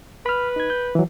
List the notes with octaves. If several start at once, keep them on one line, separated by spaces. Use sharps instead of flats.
B4 B5 F6
D#4 G#6
G6
E3 F#3